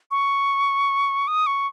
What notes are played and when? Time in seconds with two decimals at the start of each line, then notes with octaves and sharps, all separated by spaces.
0.11 C#6
1.27 D#6
1.47 C#6